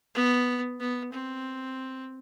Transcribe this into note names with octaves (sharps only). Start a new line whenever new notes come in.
B3
B3
C4